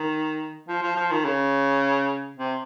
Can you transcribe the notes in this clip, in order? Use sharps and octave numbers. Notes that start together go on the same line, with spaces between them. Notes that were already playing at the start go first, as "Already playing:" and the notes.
Already playing: D#3
F3
F3
F3
D#3
C#3
C3